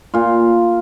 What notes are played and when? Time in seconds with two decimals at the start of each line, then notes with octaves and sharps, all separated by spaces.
0.14 A#2 F4